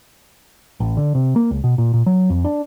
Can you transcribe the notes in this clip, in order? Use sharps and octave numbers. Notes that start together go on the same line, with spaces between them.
A1
D3
C3
A#3
C#2
B2
A#2
A#2
F#3
F2
D4